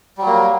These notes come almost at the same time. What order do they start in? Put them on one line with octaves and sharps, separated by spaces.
G3 F#3 A#3